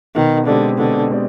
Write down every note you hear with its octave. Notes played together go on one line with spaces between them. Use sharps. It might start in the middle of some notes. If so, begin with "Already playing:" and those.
B2 D#3
D3 G#3 C4 G4 D5
B2 D3
G#3 C4 G4 D5